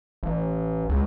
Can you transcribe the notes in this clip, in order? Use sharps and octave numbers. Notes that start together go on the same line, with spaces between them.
A1
C#2